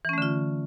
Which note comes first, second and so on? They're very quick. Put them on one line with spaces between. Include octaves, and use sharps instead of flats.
E3 C#4 A3 D3 F4